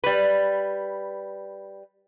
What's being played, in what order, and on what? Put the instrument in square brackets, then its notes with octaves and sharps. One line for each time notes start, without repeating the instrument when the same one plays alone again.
[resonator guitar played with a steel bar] G3 B4